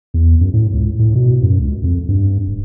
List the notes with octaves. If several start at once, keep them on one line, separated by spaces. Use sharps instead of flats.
E2
F#2
A2
C#2
A2
B2
F#2
C#2
F2
G2
D1